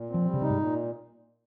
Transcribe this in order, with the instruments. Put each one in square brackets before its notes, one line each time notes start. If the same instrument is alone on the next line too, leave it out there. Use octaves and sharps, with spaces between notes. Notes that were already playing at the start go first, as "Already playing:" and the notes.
Already playing: [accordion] A#2
[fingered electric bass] F3 [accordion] C4
[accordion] G3
[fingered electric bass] C#3
[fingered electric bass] C3 [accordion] D#4
[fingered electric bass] G#2
[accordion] A#2